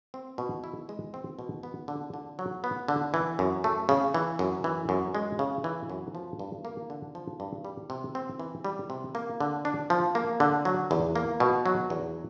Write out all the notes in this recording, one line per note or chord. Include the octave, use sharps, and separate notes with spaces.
C4
B2
E4
G#3
C4
B2
B3
D3
D3
F#3
B3
D3
E3
F#2
A3
C#3
E3
F#2
E3
F#2
G#3
C#3
E3
F#2
F3
G2
A#3
D3
F3
G2
G3
C3
C4
E3
G3
C3
A#3
D3
D4
F3
A#3
D3
F#3
E2
A#3
B2
F#3
E2